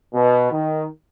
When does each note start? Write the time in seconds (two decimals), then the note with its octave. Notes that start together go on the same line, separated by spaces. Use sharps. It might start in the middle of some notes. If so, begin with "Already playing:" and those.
0.14 B2
0.52 D#3